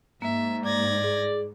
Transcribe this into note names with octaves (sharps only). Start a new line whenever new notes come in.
G#2 A#3 E5
D5 G#6 A#6
G#4